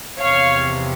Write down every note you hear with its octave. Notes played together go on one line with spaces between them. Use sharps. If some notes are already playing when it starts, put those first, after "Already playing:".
E2 C3 F3 C#5 F5